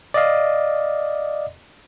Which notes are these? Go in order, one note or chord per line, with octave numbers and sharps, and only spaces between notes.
D5 D#5 F5